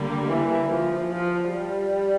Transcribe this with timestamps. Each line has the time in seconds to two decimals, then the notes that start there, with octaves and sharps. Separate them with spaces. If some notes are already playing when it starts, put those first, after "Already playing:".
Already playing: D3 G3 A#3
0.28 E3
0.70 F3
1.11 F3
1.51 G3